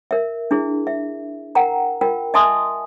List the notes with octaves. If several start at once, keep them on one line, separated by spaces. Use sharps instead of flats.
A#4 E5
D4 E4 G#4
E5
A#4 F#5 G5 A#5
F4 A#4 G5
D#5 E5 G#5 A5 C6 D#6